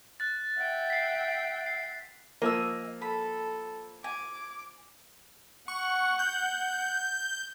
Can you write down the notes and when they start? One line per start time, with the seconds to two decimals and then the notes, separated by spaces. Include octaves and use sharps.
0.20 F#6 A6
0.57 E5 F#5 G5
0.90 B6 C7
1.66 C7
2.42 F3 A#3 D#5 G#5 E6
3.02 A4 B5
4.04 G#5 D6
5.68 F#5 C#6
6.19 G6